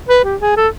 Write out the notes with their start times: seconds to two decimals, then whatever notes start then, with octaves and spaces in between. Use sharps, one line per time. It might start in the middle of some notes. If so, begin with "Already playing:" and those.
0.09 B4
0.25 G4
0.41 G#4
0.57 A4